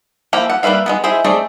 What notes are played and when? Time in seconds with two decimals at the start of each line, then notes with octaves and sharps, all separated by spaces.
0.33 F3 A#3 E4 G4
0.50 F#5
0.63 G3 A#3 B4 E5 F5
0.86 G#3 A#3 B3
1.04 E4 G#4 C5 D#5 E5
1.24 A3 C4 D#4 G#4 D5